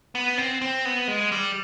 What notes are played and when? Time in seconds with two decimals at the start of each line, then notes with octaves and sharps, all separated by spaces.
0.15 B3
0.38 C4
0.62 C4
0.85 B3
1.08 G#3
1.32 G3